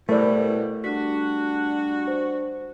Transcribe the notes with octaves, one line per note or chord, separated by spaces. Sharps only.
B2 G3 A3 E4 A#4 C5 D5
G3 D4 F#4 B6
C5